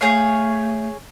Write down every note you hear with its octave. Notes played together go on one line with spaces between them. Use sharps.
A3 G#4 C#5 F5